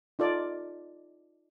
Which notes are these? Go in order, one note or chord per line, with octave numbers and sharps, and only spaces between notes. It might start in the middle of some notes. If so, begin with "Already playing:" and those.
D#4 F4 A4 D5